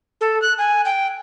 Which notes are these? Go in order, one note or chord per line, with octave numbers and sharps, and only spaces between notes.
A4
F#6
G#5
G5